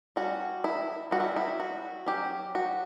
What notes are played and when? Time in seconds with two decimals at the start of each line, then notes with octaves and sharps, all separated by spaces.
0.16 G3 C#4 F#4
0.64 E4
1.11 G3 F#4
1.15 C#4
1.20 E4
1.36 E4
1.60 F#4
2.06 F#3 C#4 G4
2.55 F#4